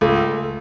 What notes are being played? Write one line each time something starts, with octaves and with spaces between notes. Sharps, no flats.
C#2 A3